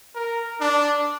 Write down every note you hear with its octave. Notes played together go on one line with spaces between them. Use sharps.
A#4
D4